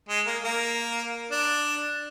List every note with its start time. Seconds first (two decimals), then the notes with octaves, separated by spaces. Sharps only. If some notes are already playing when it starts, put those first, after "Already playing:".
0.09 G#3
0.26 A#3
0.43 A#3
1.31 D4